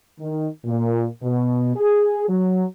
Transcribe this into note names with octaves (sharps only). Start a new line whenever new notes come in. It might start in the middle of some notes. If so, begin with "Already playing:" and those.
D#3
A#2
B2
G#4
F#3